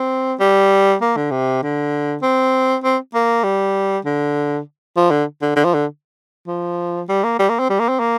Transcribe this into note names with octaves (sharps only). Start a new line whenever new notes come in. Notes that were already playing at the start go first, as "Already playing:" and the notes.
Already playing: C4
G3
A#3
D3
C3
D3
C4
C4
A#3
G3
D3
F3
D3
D3
D3
F3
D3
F3
G3
A#3
G3
A#3
C4
G3
A#3
C4
A#3